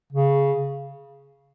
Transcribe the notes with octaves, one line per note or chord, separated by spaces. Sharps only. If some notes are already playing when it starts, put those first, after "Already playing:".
C#3